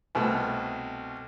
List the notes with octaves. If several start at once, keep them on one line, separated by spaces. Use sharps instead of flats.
C2 B2 A3